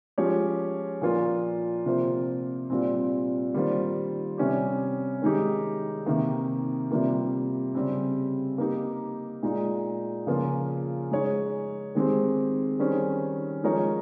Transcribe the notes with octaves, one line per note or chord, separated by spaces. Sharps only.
F3 G#3 C#4 G4 C#5
A#2 F3 A#3 F4
C3 F3 A#3 F4 C5
A#2 G3 C4
D#3 G3 A#3 F4 C5
C3 G3 C#4 G4
D#3 G#3 D#4 G4
C3 D#3 A#3
C3 G3 A#3 F4
C#3 G3 C4
A#3 D#4 G4
A#2 G#3 D#4
C#3 F3 A#3 F4
G#3 D#4 G#4 C#5
D#3 G#3 C4 G4 C5
D#3 G3 C#4 G#4 C5
F3 G#3 D#4 A#4 C#5